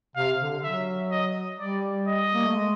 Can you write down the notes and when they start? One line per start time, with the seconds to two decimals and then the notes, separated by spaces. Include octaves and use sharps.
0.16 C3 F5
0.40 D3
0.63 F#3 E5
1.11 D#5
1.60 G3 D5
2.07 D#5
2.34 A#3
2.44 A3
2.55 G#3